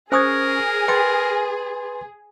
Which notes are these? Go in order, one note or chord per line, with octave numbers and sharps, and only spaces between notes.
C#4 G#4 A#4 C5 G#5 C#6 D#6 G#6
B4 G5 C6 A6